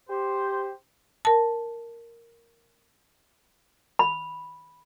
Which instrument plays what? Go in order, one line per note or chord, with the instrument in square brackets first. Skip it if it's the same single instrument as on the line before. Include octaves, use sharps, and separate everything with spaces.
[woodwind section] G4 C5
[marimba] A#4 A5
[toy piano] B5